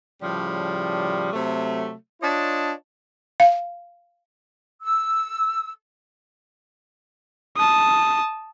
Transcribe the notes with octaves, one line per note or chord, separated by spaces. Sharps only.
A2 C#3 F3 G3
C3 F#3 A3
D4 F4 C#5 D#5 A5
F5
E6
A5 D#6